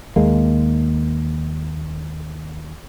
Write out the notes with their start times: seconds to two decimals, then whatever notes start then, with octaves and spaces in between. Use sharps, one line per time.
0.16 D#2 G#3 A#3